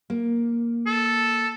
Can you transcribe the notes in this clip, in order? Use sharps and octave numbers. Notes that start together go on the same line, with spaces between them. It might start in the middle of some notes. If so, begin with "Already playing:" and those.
A#3
A4